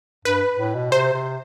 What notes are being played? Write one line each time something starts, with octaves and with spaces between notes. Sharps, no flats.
G2 B4
A2
B2
C3 C5
C3